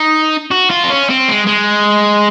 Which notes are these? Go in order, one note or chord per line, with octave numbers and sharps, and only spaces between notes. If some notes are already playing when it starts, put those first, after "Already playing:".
Already playing: D#4
F#4
F4
C4
C#4
C4
G#3
G#3